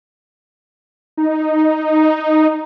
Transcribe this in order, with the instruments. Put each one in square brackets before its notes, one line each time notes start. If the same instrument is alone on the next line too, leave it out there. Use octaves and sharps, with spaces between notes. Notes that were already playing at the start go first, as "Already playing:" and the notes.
[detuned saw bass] D#4